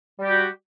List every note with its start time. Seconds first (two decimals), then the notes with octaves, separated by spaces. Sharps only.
0.19 G3
0.24 G4
0.28 F#4